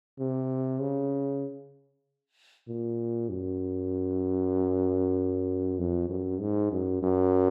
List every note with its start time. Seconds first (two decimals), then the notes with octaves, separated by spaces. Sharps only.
0.19 C3
0.81 C#3
2.68 A#2
3.30 F#2
5.79 F2
6.10 F#2
6.41 G#2
6.72 F#2
7.03 F#2